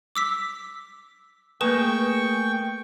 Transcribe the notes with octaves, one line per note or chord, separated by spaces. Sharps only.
D6 E6 B6
A3 A#3 G#4 B4 G5 C#6 D#6 E7